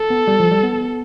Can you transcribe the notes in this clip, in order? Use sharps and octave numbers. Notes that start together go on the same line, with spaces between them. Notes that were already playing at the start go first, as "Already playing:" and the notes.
Already playing: A4
B3
G3
F3
G3
B3